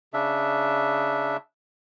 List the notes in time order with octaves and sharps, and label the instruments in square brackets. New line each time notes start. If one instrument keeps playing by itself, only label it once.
[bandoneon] C#3 D4 E5